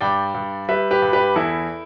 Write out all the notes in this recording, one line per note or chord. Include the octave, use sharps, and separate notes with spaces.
G2 D5 G5
G2
G3 B4 E5
G4 B4
G2
G4 B4
E2 E4 A4